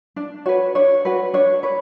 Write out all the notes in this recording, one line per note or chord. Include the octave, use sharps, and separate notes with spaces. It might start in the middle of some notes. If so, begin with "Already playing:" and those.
D4
F#4 B4 C#5
D4 C#5
F#4 B4
D4 C#5
B4 C#5